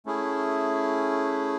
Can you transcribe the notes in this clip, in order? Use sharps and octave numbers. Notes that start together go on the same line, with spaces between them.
A3 C#4 E4 G#4